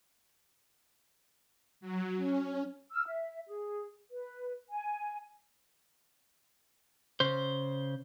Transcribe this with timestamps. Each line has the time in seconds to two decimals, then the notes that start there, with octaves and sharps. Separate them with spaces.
1.81 F#3
2.17 C#4
2.92 E6 F6
3.06 E5
3.46 G#4
4.10 B4
4.70 G#5
7.20 C#3 C5